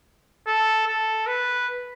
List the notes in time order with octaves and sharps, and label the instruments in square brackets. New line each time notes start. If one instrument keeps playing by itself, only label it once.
[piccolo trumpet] A4
A4
B4